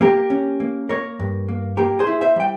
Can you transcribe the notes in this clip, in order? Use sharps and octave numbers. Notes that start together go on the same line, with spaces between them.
A#3 G4 A#4
C#4
A#3
A#3 A#4 C#5
G2
A#3
A#3 G4 A#4
G#4 C5
E4
C5 E5
G3 G5